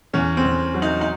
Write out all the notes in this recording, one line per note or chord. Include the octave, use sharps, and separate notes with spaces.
E2 C#4
C4
E2
F#3
D#4
D#4